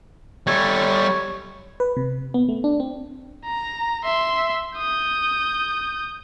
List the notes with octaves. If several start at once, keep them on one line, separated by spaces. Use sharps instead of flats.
G3 A4 C#5
B4
C3
B3
A3
D4
C4
A#5
E5 C6
D#6 G6